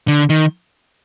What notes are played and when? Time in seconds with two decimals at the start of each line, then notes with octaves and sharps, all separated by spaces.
0.08 D3
0.30 D#3